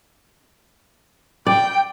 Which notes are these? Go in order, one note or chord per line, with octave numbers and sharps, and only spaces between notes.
D5 G5